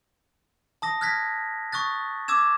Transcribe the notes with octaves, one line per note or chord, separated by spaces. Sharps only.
A5 D#6 A#6
F6 F#6 G#6 A#6 B6
C#6 D#6 F#6 A6
D6 E6 G#6 E7